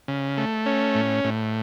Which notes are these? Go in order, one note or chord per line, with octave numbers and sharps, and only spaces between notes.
C#3
A3
C#4
A2
A2